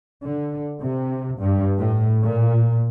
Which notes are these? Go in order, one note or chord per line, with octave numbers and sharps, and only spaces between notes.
D3
C3
G2
A2
A#2